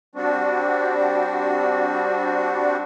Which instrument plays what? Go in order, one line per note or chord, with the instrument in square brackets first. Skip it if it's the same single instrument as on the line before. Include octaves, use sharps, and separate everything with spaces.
[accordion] G3 C4 D4 F#4